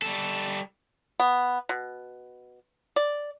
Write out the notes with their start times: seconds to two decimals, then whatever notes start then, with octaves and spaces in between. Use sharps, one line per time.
0.02 G3 A4
1.20 B3
1.69 B2
2.96 D5